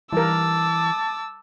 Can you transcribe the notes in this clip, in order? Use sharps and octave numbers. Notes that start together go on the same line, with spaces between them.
E3 G3 A#4 A5 D6 E6